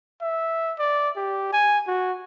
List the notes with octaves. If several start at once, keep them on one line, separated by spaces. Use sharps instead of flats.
E5
D5
G4
G#5
F#4